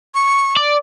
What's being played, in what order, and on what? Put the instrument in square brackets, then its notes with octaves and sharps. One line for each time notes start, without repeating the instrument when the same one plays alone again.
[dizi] C#6
[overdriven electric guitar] D5